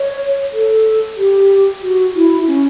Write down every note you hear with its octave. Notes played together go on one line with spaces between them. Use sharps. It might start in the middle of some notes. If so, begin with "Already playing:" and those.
Already playing: C#5
A4
G4
F#4
E4
C#4